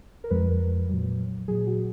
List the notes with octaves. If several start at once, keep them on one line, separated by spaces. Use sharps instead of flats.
A#4
F2 F3 G#3 B4
A#2 F#3
A#2 F#3 G#4
F#4